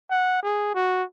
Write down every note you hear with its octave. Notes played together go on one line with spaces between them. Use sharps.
F#5
G#4
F#4